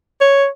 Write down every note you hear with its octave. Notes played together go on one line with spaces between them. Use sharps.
C#5